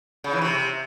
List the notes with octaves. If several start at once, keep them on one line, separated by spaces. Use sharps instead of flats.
C#3
E3
C3